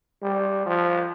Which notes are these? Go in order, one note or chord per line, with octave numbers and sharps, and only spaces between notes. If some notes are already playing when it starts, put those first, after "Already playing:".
G3
F3